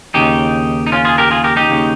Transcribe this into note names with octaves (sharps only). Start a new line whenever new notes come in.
D#2 C#3 D#4 G4
D#4
C#4 F4
F4 G#4
G4 A#4
F4 G#4
G4 A#4
D#4 G4
D#2 C#3